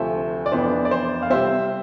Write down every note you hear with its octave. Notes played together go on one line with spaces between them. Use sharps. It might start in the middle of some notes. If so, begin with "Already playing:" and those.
Already playing: D2 C3 F3 A3 C5 E5
D5
F2 E3 B3 D4 C5
D5
C5
F5
C3 G3 C4 C5 E5